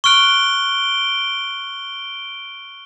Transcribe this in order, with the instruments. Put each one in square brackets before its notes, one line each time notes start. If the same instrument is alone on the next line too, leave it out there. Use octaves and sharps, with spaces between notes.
[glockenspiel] C#6 F6 F#6 [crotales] D7 G7